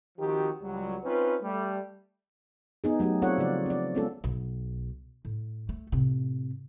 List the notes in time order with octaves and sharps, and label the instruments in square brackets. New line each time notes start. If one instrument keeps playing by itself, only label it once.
[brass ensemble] D#3 F3 C4 F#4 G4
C#2 F#3 G3
C4 C#4 D#4 F4 B4
G3 A3
[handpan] B3 D#4 G#4
F#3 A3 D#4 G4
C4 F4 A4 C#5 D5 F#5
C#3 F3 F4 D5
C4 D5
G#3 B3 C#4 F4 A4
[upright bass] B1
A2
A3
A2 C3